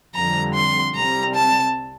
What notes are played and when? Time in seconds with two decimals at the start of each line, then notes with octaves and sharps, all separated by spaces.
0.14 F2 D3 G3 A#5
0.54 C6
0.94 C2 C3 G3 C4 A#5
1.35 A5